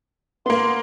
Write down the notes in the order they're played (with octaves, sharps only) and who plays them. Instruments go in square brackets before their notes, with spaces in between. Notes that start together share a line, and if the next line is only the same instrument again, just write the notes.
[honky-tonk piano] A#3 B3 [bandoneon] C6